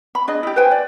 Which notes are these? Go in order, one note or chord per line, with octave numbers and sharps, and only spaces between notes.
B5
D4 G#4 D#5
E4 G4
B4 C5 G5 G#5
D5